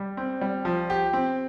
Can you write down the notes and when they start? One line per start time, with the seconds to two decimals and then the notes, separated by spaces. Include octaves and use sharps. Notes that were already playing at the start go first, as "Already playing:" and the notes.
Already playing: G3
0.17 C4
0.41 G3
0.65 F3
0.90 G4
1.13 C4